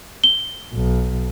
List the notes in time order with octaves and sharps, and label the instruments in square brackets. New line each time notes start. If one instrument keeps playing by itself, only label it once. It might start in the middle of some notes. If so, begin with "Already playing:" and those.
[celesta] G7
[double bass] B1